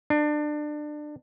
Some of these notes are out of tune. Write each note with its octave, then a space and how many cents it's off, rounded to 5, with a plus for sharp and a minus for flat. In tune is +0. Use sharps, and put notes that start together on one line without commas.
D4 +25